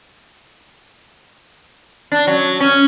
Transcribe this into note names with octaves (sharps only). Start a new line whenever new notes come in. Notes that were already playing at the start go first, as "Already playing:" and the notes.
D4
F#3
C#4